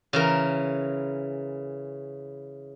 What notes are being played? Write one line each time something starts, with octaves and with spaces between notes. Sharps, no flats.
C#3 E3 A#4